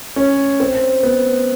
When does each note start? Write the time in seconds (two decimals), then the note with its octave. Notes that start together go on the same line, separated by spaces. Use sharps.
0.16 C#4
0.60 C4
1.03 B3